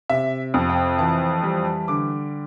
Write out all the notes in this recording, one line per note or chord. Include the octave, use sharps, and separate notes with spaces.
C3 E5
F2
G5
E3 A5
G3
D3 D6